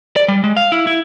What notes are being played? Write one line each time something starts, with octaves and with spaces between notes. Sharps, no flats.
D5
G3
G#3
F5
E4
E4